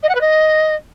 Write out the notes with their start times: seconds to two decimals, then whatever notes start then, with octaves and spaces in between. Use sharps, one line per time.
0.03 D#5
0.09 F#5
0.15 B4
0.21 D#5